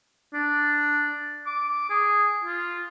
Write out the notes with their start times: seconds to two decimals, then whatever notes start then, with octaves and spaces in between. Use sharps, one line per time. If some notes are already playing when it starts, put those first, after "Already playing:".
0.34 D4
1.47 D6
1.90 G#4
2.44 F4